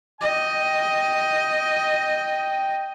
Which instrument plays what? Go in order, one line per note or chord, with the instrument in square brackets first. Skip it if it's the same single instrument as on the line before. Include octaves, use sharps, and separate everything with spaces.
[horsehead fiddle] D#5 [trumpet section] G5